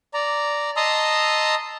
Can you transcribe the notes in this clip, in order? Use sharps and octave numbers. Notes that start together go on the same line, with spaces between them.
D5 A#5
D#5 A5 A#5 C6 D#6 E6